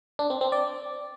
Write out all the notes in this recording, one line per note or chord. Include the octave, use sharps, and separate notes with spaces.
D4
C4
C4
D5